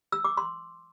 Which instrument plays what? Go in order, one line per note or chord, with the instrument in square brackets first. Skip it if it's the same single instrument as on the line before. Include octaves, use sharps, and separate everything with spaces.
[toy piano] E6
D6
C6